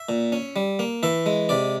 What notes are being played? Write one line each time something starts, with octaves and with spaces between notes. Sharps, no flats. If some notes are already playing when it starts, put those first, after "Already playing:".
Already playing: E5
A#2
C#4
G3
A#3
E3 E5
G#3
C3 D5